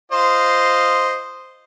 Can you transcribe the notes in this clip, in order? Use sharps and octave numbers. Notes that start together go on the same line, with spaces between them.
F4 C5 D#5